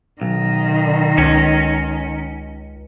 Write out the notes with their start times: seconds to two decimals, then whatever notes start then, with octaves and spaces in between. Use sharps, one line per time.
0.21 B1 D#3
1.18 C#2 C#4